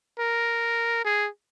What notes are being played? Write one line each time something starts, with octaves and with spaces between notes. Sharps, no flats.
A#4
G#4